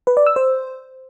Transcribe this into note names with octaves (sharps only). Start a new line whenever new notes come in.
B4
D5
E6
C5